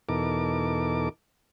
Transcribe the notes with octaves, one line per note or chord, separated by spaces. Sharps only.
E2 B2 D#4 A4 A#4 D6